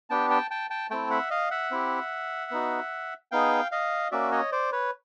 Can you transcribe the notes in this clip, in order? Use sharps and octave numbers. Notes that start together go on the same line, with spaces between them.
B3 D4 G4 G5 A5
G5 A5
G5 A5
G5 A5
A3 C4 E4 G5 A5
E5 F#5
D#5 F5
E5 F#5
C4 E4 G4
B3 D#4 F#4
B3 D#4 G#4 F5 G5
D#5 F5
A#3 C#4 F#4 D5 E5
C#5 D#5
C5 D5
B4 C#5